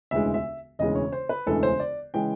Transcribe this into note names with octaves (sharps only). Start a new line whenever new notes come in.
E1 D2 C#3 E3 G#3 E5
E5
E1 D2 C#3 E3 G#3 D#5
C#5
C5
B4
E1 D2 C#3 E3 G#3 A4
C5
D5
C#3 E3 G#3 G5